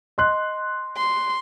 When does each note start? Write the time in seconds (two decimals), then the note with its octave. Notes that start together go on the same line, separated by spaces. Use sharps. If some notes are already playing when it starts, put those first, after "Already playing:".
0.18 D#5 C6 F#6
0.96 C6